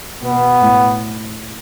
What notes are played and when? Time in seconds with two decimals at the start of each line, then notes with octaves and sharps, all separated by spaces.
0.22 B2 B3
0.61 A2